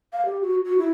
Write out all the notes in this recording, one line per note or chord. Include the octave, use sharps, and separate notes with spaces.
F5
G4
F#4
F#4
E4